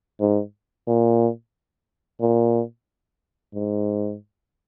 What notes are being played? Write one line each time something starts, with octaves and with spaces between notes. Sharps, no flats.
G#2
A#2
A#2
G#2